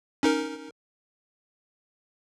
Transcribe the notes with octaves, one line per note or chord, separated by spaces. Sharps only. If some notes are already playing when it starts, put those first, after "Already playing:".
C#4 D#4 A#4